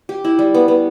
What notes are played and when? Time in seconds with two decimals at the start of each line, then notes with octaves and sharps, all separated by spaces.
0.09 G4
0.24 E4
0.39 G3
0.54 B3
0.68 B3